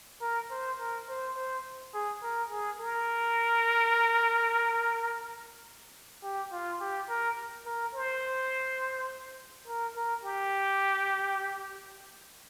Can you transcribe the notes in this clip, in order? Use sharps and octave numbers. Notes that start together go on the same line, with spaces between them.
A#4
C5
A#4
C5
C5
G#4
A#4
G#4
A#4
G4
F4
G4
A#4
A#4
C5
A#4
A#4
G4